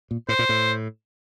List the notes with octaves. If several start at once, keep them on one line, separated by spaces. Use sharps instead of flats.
A#2
A2 C5
A#2
A2